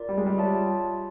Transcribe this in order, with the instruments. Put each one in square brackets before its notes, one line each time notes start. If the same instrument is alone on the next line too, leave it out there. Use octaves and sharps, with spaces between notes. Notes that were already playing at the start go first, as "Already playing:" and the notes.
Already playing: [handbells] F4 A#4 D5
[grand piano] G3
G#3
G3
[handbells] F4 G#4 C#5 E5 A5